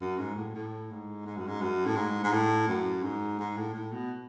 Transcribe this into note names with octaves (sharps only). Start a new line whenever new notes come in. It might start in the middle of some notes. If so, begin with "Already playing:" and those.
F#2
G#2
A2
A2
G#2
G#2
F#2
G#2
F#2
A2
G#2
G#2
A2
F#2
G#2
G#2
A2
A2
B2